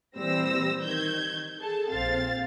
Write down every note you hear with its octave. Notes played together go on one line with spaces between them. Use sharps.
A#2 E3 G3 C4 E6 A#6
D#3 G6 G#6
G#4 A4 A5
A#1 C4 F5 A6